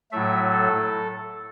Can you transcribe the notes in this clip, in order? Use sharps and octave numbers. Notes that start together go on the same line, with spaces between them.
A2 F#3 A3 E5
A4